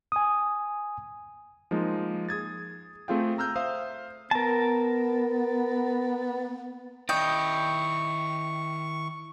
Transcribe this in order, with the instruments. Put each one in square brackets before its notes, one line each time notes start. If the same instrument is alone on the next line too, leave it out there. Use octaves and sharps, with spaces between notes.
[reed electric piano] G#5 D#6
[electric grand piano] F3 G#3 A#3 D#4
G#4 D#6 G#6 A6
A3 C4 F4 G#4 F5 G5
A#5 E6 F6 G6
C5 E5 F5 D#6
[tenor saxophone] B3 [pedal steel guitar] A#4 A5
[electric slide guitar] D#3 A#4 D5 [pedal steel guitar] E4 D#5 D#6 [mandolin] G5 [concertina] C#6